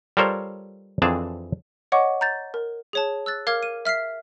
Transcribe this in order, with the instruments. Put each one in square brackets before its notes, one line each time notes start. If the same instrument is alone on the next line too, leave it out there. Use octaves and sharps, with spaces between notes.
[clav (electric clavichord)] G3 F4 A4 A#4 C5 C#5
F2 E3 C4 D4 G#4 A5
[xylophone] C#5 D#5 F#5 C#6 D6
A#5 G6 A6
A#4
G#4 C#5 A5
E6 F#6 A6
A#4 F5 D6 F6 G#6
D#7
E5 F6 B6 C7